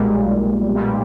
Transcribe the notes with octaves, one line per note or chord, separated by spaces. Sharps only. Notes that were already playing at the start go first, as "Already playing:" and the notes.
Already playing: B1 A#2 G3 G#3
B1 A#2 G3